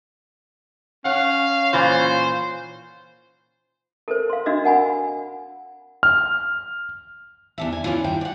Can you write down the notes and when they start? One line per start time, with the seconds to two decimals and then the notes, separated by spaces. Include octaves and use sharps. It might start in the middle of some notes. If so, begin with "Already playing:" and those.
1.05 C#4 F5 F#5
1.73 A#2 E3 F4 C5
4.08 A4 A#4 C5
4.30 F5 C6
4.46 D4 F#4 D#5 F5 E6
4.64 A#4 F#5 G#5 B5
6.03 F6
7.58 E2 D4 E5
7.72 G#5
7.84 E3 C#4 D4 E4 F4
8.04 G2 D#3 G5
8.21 D5 F#5